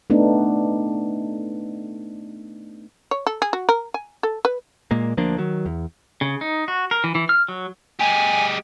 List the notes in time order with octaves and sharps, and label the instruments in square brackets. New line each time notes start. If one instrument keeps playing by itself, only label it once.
[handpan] A3 B3 D4 D#4
[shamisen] C#5
A4
G#4
F#4
A#4
G#5
A4
B4
[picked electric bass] A#2 G#3 A#3
D2 F3 A#3 D4
D#3 F#3
E2
[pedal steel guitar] C#3
D#4
F#4
A#4
E3
E3
F6
F#3
[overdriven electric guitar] G#3 G4 [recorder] G#5